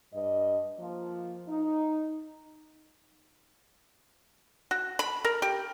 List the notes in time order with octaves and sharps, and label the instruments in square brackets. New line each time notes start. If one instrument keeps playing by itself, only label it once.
[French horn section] G2 D#5
F3 A#3
D#4
[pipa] F#4
B5
A#4
G4